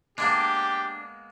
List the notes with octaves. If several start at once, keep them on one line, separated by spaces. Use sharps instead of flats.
G#3 A#3 B3 D4 G4